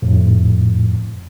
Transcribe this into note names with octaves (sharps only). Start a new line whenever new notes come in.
F2 A2